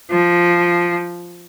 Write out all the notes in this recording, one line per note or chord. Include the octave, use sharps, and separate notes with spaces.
F3